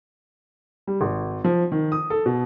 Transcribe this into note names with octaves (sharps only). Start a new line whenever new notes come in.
G3
G#1
F3
D#3
D#6
A4
B2